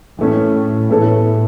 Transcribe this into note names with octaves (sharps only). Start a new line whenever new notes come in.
A2 E3 A3 C#4
A2 E3 B3 E4 A4 C#5